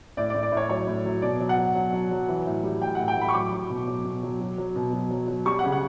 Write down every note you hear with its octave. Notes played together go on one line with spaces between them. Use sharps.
A2 D5
D5
A2
D5
A2
C#5
F#3 C#5
A2
F#3
B2 D5
F#3
F#5
F#3
F#3
F#3
F#3
E3
A2
G3
A2 G5
F#5
A2
G5
A2
B5
C#6
F#3 D6
F#3
B2
F#3
B2
F#3
F#3
F#3
B2
F#3
F#3
F#3
G3 C#6
F#5
C#3
F#5